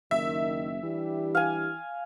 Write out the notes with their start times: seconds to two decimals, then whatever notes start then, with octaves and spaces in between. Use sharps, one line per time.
0.11 F#1 D#3 E5
0.82 E3 G3 D4 G4
1.35 F5 G#5